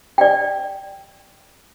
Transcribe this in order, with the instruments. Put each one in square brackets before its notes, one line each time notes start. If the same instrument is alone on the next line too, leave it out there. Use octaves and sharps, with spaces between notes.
[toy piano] D5 G5